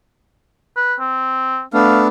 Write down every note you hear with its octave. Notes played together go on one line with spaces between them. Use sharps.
B4
C4
A3 B3 D4 F5